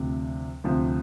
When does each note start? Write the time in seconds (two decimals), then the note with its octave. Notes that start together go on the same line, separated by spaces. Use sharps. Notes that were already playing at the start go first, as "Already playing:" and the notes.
Already playing: D2 C3 F3
0.64 D2 C3 F3